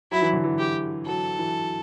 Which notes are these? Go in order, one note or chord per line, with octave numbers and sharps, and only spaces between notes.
F#3 E4
E3
D3
E3
G4
F#3 A4
E3